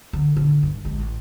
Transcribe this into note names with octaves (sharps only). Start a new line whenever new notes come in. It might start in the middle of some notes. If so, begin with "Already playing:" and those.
D3
D3
G2
A1 G#3